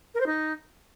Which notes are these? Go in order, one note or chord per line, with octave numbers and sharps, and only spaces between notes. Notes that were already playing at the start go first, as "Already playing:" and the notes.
A#4
C5
D#4